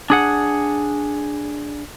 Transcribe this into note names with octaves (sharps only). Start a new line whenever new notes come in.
D4 G#4 F#5